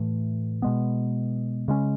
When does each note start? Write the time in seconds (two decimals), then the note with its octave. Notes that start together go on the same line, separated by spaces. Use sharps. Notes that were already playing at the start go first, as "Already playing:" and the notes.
Already playing: A2 E3 A3
0.62 B2 G#3 B3
1.68 C#3 G#3 C#4